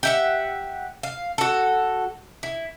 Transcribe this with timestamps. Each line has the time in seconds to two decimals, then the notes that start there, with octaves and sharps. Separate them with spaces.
0.03 G4 E5 F#5
1.03 F5
1.38 F#4 A4
2.43 E4